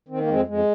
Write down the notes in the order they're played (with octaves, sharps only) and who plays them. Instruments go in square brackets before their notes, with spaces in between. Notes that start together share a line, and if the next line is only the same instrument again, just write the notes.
[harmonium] D#3 C4
A#3
F2 G#3 C4
F2 G#3